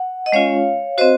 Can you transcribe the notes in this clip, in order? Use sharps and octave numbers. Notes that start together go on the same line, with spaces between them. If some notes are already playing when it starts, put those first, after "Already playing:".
Already playing: F#5
D#5
G#3 C#4 F4 C#5 F5
C4 F#4 C5 D#5